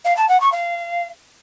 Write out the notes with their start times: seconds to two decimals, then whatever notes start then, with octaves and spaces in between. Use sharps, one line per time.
0.04 F5
0.16 A5
0.28 F#5
0.40 C#6
0.52 F5